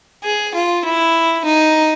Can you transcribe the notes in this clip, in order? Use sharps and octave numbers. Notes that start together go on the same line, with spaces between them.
G#4
F4
E4
D#4